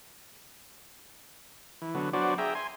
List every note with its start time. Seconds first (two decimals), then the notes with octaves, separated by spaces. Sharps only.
1.82 E3
1.95 D3 F#3 B3
2.13 F#3 B3 D4 F#4 C5 D5
2.38 G#4 E5 G5 A#5
2.55 G#5 C6